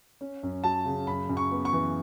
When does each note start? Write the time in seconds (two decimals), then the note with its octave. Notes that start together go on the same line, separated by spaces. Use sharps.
0.21 C#4
0.43 F#2
0.64 F#3 A5
0.85 C#3
1.07 F#2 B5
1.29 F#2
1.37 C#6
1.51 B3
1.65 C#6
1.73 E3